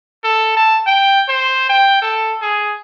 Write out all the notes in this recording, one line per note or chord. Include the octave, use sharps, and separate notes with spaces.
A4
A5
G5
C5
G5
A4
G#4